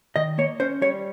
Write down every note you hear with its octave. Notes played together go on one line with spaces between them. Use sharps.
D#3 D#5
A#3 C#5
C#4 C5
G3 C#5